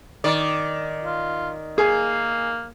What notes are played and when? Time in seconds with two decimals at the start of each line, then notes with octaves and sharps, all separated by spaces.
0.24 D#3 D5
1.04 F4
1.78 A#3 G#4